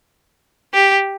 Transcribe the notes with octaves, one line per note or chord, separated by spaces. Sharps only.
G4